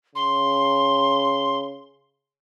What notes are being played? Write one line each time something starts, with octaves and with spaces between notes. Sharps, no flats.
C#3 C6